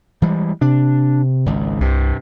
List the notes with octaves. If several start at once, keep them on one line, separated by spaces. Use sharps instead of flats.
E3 G3 G#3
C3 D4
G#1 C#2
C2 G2 C3